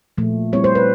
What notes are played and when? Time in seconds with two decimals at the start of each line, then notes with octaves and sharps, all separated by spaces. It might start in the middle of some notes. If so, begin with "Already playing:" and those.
0.18 A#2 F3 A3
0.53 G3 C4 E4 C#5
0.64 C5
0.75 B4